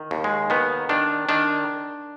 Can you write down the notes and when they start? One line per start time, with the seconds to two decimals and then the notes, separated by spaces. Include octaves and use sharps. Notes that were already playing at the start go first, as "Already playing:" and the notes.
Already playing: D#3
0.11 D#2
0.24 G#3
0.50 D#3 B3
0.89 D#3 D4
1.29 D#3 D4